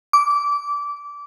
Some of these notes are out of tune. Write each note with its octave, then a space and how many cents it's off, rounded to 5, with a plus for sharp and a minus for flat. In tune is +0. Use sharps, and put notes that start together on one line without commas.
D6 -20